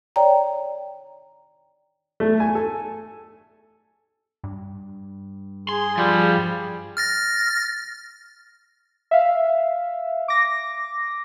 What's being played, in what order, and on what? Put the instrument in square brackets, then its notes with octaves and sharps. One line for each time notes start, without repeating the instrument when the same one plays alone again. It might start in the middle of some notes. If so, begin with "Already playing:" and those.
[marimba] C#5 D5 G5 A#5
[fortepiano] A3
G#5
A4
[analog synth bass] G2
[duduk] G#4 [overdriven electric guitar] C6
[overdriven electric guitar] F3 [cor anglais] G3
[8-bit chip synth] F6 A6 A#6
[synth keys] E5 F5
D6 A#6